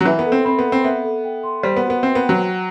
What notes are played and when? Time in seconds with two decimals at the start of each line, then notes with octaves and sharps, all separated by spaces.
0.01 F#3
0.05 E3 E5
0.19 B3
0.26 A4
0.32 C4
0.45 C4 B5
0.59 B3
0.65 A4
0.72 C4
0.84 B3 E5
1.04 A4
1.24 G5
1.43 C6
1.63 G3 C5
1.77 B3
1.84 F#4
1.90 B3
2.02 C4 E5
2.15 B3
2.22 G5
2.29 F#3
2.43 F#5